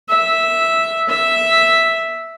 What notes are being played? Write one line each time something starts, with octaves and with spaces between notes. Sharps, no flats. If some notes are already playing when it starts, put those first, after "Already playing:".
E5
E5